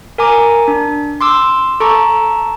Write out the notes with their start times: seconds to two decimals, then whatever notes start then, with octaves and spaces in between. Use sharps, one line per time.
0.18 A#4 G#5 A#5 D6
0.68 D4
1.21 C6 D6 E6
1.80 A4 A5 A#5 C#6 D6